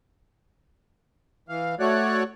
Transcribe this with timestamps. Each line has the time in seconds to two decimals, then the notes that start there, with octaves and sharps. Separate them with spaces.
1.49 E3 F5
1.80 A3 F#4 C#5 D5 F#6